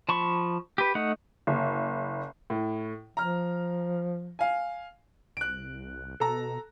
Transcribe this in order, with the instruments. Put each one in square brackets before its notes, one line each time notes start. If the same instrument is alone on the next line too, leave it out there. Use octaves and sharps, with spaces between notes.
[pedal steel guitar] F3 A5 B5 C#6
G4 B4
A3 D#4 F#5
[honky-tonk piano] F#1
[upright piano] A2
[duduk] F3 [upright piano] A#5 F6
[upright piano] F5 G#5
[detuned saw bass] C2 [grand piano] F#6 D7
[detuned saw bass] B2 [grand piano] A4 A#5